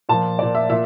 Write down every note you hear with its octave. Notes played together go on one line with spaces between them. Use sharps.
A#2 F3 A5
A#2 F3 D5
E5
A#2 E5